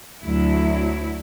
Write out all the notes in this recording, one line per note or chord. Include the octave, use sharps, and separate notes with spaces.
D2 F#3 E4